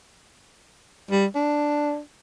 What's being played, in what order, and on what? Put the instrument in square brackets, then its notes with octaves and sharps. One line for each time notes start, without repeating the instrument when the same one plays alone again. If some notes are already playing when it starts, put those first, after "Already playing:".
[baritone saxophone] G3
D4